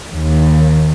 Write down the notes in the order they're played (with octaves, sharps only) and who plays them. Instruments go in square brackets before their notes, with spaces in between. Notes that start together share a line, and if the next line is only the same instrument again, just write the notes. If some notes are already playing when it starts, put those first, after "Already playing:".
[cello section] D#2